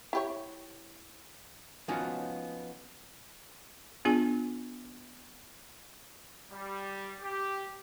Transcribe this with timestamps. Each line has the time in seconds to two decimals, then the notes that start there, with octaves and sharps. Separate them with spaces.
0.13 E4 G4 C#5
1.88 F3 B3 C#4 D#4 F4 F#4
4.05 B3 D4 F4 G#4 G#5
6.51 G3
7.20 G4